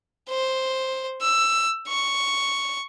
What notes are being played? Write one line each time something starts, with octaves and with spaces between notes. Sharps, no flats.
C5
E6
C#6